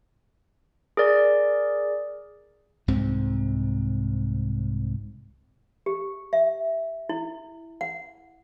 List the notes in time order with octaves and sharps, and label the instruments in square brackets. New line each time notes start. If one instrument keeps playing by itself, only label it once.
[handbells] G#4 A#4 D5
[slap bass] C2 G#2 C3 C4
[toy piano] G4
E5
E4
F#5